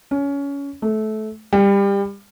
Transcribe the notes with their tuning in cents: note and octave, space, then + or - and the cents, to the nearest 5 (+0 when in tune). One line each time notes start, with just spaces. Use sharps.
C#4 +20
A3 -20
G3 +25